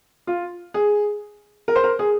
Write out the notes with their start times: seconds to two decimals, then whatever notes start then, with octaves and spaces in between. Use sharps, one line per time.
0.27 F4
0.74 G#4
1.68 A#4
1.76 C5
1.84 A#4
1.99 G#4